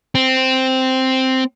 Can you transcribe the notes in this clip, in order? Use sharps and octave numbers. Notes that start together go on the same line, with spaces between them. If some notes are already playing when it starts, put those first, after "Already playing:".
C4